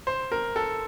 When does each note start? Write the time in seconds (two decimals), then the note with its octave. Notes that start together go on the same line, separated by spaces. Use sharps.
0.07 C5
0.32 A#4
0.56 A4